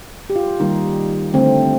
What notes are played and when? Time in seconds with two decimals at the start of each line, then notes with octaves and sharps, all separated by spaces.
0.30 G4
0.36 F4
0.60 D#3 G3 A#3 D#4
1.34 D3 A3 C4